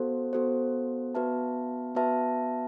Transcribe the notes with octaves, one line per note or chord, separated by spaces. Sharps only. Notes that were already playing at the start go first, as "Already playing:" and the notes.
Already playing: B3 F#4 A4 C5
B3 F#4 A4 C5
B3 F#4 B4 E5 A5
B3 F#4 B4 E5 A5